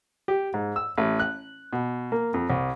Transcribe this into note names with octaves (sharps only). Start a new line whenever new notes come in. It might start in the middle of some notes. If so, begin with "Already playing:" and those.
G4
G#2
E6
A1
F#6
B2
A#3
F2
C2